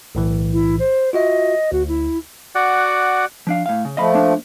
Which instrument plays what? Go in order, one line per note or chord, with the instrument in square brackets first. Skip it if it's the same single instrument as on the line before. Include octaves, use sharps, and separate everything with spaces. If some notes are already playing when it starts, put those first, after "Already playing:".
[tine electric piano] B1 A2 E3
[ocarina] E4
C5
[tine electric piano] F4 F#4 E5 [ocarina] D#5
[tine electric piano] D2 [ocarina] F#4
[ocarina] E4
[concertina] F#4 D5 F#5
[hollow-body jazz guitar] F3 D4 F5
A2 F5
C#3
[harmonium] F3 A3 [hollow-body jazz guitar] D#5 F5 B5
[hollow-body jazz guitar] A#3 D4